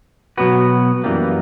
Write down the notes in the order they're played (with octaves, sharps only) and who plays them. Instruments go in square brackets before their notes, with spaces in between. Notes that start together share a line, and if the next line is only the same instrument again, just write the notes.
[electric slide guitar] B2 F#3 B3 F#4 B4
F#2 E3 G3 A#3